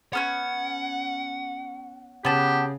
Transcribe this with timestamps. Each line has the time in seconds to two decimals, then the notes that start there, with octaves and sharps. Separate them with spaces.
0.13 B3 C#4 C#5 F#5
2.25 C#3 B3 G4 A5